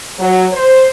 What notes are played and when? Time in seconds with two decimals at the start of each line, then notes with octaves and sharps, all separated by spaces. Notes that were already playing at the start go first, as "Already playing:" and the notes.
0.19 F#3
0.53 C5